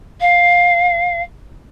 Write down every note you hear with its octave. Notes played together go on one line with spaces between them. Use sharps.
F5